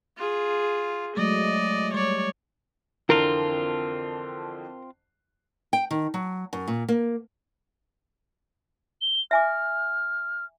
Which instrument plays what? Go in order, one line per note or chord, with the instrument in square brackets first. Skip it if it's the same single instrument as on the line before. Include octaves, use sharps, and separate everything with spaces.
[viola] F4 G#4
[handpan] F#3 G#3 A3 [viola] D5 D#5
[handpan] G3 [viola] C#5 D5
[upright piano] F2 D3 E3 [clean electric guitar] C4 F4 [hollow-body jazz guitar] A#4
[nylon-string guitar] G5
D#3
F#3
F#2
A#2
A#3
[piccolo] G7
[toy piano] E5 G#5 D6 [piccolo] F6